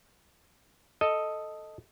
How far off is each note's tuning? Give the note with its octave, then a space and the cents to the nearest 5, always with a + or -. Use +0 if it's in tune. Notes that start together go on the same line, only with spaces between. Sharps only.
A4 +0 D#5 +0